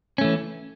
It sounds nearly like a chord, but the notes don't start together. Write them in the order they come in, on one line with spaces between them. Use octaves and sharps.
C#4 A3 E3